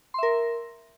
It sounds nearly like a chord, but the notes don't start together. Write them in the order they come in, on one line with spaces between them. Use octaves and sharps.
C6 E5 A#4